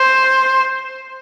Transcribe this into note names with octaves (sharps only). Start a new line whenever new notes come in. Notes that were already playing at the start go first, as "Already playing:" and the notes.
Already playing: C5